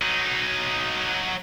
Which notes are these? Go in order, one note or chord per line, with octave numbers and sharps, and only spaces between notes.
F#3 D#4